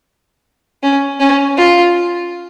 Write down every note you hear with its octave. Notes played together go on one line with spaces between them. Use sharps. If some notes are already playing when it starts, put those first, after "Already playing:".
C#4
C#4
F4